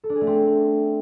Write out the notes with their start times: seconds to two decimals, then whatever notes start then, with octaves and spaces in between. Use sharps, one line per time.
0.04 A4
0.09 D4
0.15 G#4
0.21 A3
0.27 C4